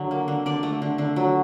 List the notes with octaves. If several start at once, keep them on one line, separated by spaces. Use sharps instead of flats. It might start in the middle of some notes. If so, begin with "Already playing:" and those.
Already playing: D3 F#3
A#3
D3
D3 D5
A3
D3
D3
F#3